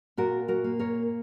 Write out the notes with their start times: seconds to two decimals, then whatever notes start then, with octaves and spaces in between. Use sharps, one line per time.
0.17 A#2 F#4 A#4
0.48 F#4 A#4
0.64 A#3
0.79 A#4 C#5